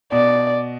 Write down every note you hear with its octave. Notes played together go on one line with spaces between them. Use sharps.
B2 D5